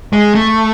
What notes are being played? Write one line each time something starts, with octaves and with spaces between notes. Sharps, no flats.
G#3
A3